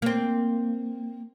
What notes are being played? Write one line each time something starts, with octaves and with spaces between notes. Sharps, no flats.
A#3 C4